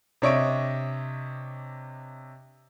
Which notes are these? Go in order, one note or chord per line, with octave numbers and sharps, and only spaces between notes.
C3 D4 C#5 D#5 E5 D7